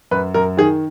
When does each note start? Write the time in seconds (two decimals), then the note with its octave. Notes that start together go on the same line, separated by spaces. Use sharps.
0.11 F#2 B4
0.34 F#2 A#4
0.57 D#3 G#4